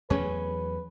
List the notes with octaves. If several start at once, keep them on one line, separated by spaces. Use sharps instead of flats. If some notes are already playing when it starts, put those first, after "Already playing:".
E2 F#3 A3 C#4 G#4 B4